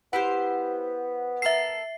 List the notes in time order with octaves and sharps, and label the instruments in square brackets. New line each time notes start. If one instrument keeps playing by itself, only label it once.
[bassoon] B3 [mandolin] E4 G4 C5 [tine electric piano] F#5
[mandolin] A4 A#4 [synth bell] E5 C7